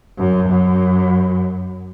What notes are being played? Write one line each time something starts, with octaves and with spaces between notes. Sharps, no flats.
F#2
F#2